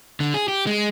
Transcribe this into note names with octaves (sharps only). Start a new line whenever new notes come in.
D3
G#4
G4
G#3